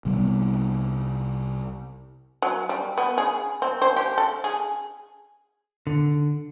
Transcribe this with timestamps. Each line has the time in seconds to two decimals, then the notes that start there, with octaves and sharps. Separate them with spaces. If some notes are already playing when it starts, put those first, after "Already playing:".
0.05 C2 C3 G3 B3
2.42 F#3
2.69 G3
2.98 B3
3.18 G#4
3.62 C4
3.82 C5
3.96 G4
4.18 A4
4.44 G#4
5.87 D3